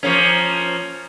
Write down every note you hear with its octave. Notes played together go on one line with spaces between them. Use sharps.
F3 A#3 C#4